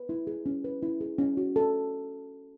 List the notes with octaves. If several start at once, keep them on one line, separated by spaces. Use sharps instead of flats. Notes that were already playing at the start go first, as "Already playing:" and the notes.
Already playing: B4
E4
G#4
C#4
B4
E4
G#4
C#4
F#4
A4